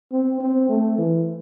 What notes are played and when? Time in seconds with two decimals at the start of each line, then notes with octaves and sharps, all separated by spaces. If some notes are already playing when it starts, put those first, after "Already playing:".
0.12 C4
0.41 C4
0.69 A3
0.98 E3